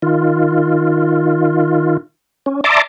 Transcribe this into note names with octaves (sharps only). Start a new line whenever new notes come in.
D#3 F4
C#4
D5 E5 A5 A#5 C6 D6